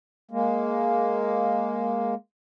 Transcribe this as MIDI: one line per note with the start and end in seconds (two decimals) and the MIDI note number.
0.31 2.14 56
0.31 2.14 58